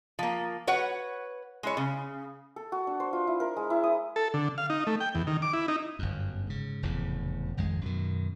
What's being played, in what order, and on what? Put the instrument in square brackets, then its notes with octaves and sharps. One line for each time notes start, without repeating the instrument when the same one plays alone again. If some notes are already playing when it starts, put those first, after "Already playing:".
[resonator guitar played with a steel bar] F3 A#3
F#4 B4 C#5 F#5
G#3 E4 C#5
C#3
[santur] A4
F#4
D4
C5
F4
E4
A#4
G#3
E4
D#6
[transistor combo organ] A4
D3
F5
D#4
A3
G5
E2
D#3
D6
E4
D#4
[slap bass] G1 F#2
G#2 C#3
F1 E2 A2 C#3
G#1 F2 D#3 G#3
F#2 B2 D#3